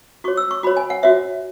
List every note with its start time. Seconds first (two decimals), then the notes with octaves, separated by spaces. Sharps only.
0.24 F#4 C#5 C#6
0.37 E6
0.51 C#6
0.63 F#4 C#5 B5
0.77 G#5
0.90 F#5
1.03 F#4 C#5 E5